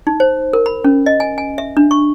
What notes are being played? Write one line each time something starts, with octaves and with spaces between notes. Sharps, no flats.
D#4
C5
A#4
B5
C#4
D#5
G#5
G#5
E5
D4
C#6